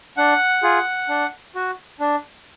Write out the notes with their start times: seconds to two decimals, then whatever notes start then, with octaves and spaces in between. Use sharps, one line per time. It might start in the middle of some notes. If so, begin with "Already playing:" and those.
0.17 D4 F#5
0.63 F4 G#4
1.09 D4
1.55 F#4
2.00 D4